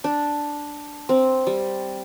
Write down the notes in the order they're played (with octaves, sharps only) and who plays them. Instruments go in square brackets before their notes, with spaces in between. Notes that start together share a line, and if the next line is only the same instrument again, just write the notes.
[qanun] D4
C4
G3